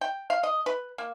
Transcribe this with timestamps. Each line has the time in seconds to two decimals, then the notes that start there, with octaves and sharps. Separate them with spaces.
0.01 G5
0.30 F5
0.43 D#5
0.66 B4
0.98 A#3